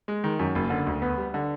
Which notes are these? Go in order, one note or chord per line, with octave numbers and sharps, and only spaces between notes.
G#3
D#3
F#2
F#1
D3
D2
B3
G3
D3